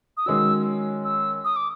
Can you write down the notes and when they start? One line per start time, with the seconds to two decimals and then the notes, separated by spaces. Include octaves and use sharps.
0.17 D#6
0.26 D#3 G#3 C#4 F#4 E6
1.05 E6
1.45 D#6
1.56 D6